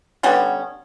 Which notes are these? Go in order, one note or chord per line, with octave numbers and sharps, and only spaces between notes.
D3 G3 B3 C#4